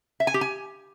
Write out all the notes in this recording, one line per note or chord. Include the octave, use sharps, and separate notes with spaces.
E5
G#5
G4
G#5